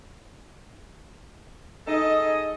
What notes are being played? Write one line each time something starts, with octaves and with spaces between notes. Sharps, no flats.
D#4 G#4 A4 D#5